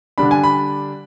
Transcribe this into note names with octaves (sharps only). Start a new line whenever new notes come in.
D3 G3 D4 B5
G#5
B5